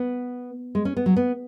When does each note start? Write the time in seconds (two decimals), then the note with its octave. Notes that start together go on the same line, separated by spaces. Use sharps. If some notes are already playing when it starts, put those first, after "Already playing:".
Already playing: B3
0.75 G#3
0.85 C#4
0.97 B3
1.06 F#3
1.17 B3